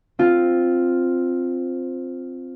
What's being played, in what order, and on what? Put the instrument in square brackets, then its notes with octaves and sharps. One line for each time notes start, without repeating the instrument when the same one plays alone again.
[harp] C4 F4